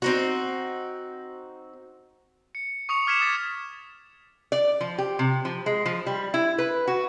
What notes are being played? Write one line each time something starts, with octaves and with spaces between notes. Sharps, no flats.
C4 D#4 F#4
C#7
C#6 D#6 C#7 F7
D6 F6 G#6 B6 C#7 E7
D#6 A6 B6
D5
F3
G4
C3
F3
G#3
F3
G3
E4
B4
F#4